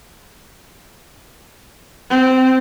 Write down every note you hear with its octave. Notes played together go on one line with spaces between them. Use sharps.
C4